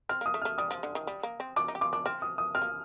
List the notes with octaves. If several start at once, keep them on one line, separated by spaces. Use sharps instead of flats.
C4 F6
A#3 D#6
A3
F6
A3
G3 D#6
F3
D3
D#3
G3
A#3
C4
D4 D6
D#4
G4
F4 D6
D4 D6
C4 F6
D#6
D#6
C4 F6
A#3